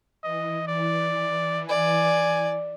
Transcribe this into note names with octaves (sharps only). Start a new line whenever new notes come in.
E3 D#5
E3 D5
D5 G#5